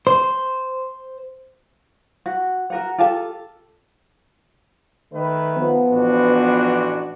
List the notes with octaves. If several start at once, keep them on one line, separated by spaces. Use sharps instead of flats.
C5
F#4
F#4 A#4 F#5
F4 G4 A4 A5
D#3 A3 B4
F3 B3
A1 D4 F#4